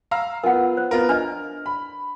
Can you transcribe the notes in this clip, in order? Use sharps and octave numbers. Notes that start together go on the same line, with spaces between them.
F5 A#5 E6
B3 F4 A#4 F#5
C5
B3 F4 A#4
D4 D#5 F6
B5